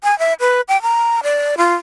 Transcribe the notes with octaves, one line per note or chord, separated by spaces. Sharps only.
G#5
E5
B4
G5
A#5
D5
F4